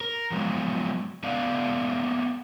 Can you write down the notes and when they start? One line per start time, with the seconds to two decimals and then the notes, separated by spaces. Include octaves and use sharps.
0.01 A#4
0.31 F3 F#3 G#3 B3
1.23 A3 B3 D5 F5 F#5